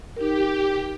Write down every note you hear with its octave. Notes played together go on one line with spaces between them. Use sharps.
D#4 G4 A#4